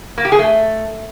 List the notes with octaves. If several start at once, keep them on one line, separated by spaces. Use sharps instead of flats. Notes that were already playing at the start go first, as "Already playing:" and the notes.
A#3
G4
G#4
A3